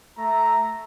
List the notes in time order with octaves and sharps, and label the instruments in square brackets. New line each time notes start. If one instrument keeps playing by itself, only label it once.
[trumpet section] A3 E5 A#5